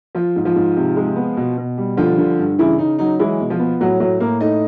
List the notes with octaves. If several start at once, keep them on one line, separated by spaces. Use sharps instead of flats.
F3 F4
G#2
F3 F4
G#2
C3
G#3
B3
B2
B2
G3
D3 F3 F4
D3
G2
C#3 E3 E4
C#3 D#4
F#3 D#4
E3 G#3 E4
B2
F3 F4
B3
A2 F#3 F#4
A2 F#3 F#4
A2 A#3 A#4
A3 D#4 D#5